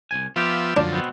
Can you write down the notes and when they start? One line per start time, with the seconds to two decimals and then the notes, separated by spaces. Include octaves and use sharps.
0.11 C2 F#2 G#5
0.36 F3 B3 F4 G4 E5
0.77 F#2 D3 F3 D4
0.92 B2 B3 C4